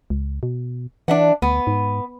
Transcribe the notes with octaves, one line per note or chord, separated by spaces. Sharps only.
C#2
B2
E3 D4 E5 F#5
D2 B3
G#2